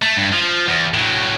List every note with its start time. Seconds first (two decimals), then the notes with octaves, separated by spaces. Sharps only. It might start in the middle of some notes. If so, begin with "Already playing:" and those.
0.02 A3
0.16 G2
0.33 F3
0.68 E2
0.94 A2 F#3